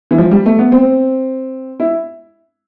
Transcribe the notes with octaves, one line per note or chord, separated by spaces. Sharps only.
E3
F3
G3
A3
B3
C4
E4